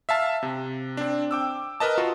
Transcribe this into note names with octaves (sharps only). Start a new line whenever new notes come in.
E5 F5 A5
C3
C4 D4
G5 D6 E6
A#4 B4 D#5 A5
F4 F#4